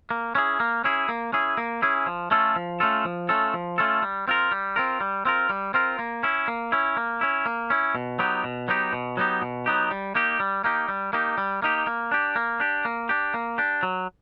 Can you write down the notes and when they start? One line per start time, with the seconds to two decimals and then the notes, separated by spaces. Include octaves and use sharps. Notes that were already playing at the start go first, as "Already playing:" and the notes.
0.11 A#3
0.35 C#4 E4 G#4
0.60 A#3
0.84 C#4 E4 G#4
1.09 A#3
1.33 C#4 E4 G#4
1.57 A#3
1.82 C#4 E4 G#4
2.07 F3
2.31 A3 C#4 F4 A4
2.56 F3
2.80 A3 C#4 F4 A4
3.05 F3
3.29 A3 C#4 F4 A4
3.54 F3
3.78 A3 C#4 F4 A4
4.03 G3
4.28 C4 F4 A#4
4.52 G3
4.76 C4 F4 A#4
5.01 G3
5.25 C4 F4 A#4
5.50 G3
5.74 C4 F4 A#4
5.99 A#3
6.23 C#4 E4
6.48 A#3
6.72 C#4 E4
6.97 A#3
7.21 C#4 E4
7.46 A#3
7.70 C#4 E4
7.95 B2
8.19 F#3 B3 D#4 G4
8.44 B2
8.68 F#3 B3 D#4 G4
8.93 B2
9.17 F#3 B3 D#4 G4
9.42 B2
9.66 F#3 B3 D#4 G4
9.91 G3
10.15 A#3 D#4 G4
10.40 G3
10.64 A#3 D#4 G4
10.88 G3
11.13 A#3 D#4 G4
11.38 G3
11.62 A#3 D#4 G4
11.87 A#3
12.12 D4 G4
12.36 A#3
12.60 D4 G4
12.85 A#3
13.09 D4 G4
13.34 A#3
13.58 D4 G4
13.83 F#3